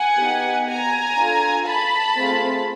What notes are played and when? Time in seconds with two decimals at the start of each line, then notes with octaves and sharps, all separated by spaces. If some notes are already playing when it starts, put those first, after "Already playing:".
Already playing: F#5 G#5
0.17 B3 D#4 G4
0.67 G#5 A#5
1.17 D4 F4 A4
1.66 A5 B5
2.16 A3 C4 F4 G#4